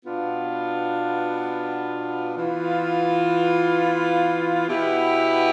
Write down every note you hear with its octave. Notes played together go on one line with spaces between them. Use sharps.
B2 B3 D4 F4
E3 B3 F4
B2 B3 E4 G4